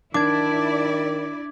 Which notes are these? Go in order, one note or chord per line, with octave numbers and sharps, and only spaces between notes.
D#3 D4 E4 D5 D6 G#6